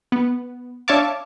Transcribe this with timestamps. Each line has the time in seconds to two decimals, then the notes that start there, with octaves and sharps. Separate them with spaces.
0.12 B3
0.88 D4 C#5 E5 F5 A5 D6